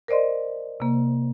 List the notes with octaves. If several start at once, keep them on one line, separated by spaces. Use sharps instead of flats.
A#4 C5 D5 D#5 C6
C3 A#3